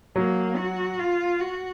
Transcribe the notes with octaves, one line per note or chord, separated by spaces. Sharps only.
F#3 A#3
F#4
F4
F#4